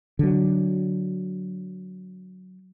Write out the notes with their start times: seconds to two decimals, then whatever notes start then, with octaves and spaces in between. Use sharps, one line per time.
0.19 D3 F#3